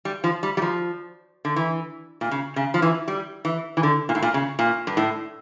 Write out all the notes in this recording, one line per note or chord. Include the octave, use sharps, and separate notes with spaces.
G3
F3
G3
G3
F3
D3
E3
A#2
C#3
C#3
F3
E3
G3
E3
E3
D3
A#2
A2
A#2
C#3
A#2
G2
A2